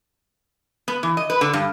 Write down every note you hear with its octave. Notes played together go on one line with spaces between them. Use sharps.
B3
E3
D#5
B4
D3
G2